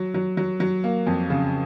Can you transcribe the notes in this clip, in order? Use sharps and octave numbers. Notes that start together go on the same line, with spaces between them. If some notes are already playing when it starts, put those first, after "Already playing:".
Already playing: F#3
F#3
F#3
F#3
A#3
F2
C#3